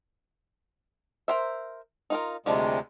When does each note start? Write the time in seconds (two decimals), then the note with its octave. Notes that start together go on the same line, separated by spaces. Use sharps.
1.28 A#4 C5 E5
2.10 D#4 F4 A#4
2.46 D2 C3 F3 G3 G#3 D4